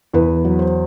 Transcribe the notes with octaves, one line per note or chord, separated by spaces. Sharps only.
E2 B4
F#3
C5